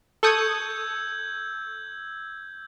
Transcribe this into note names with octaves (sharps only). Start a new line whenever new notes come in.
A4 C#6 D#6 E6 G6 G#6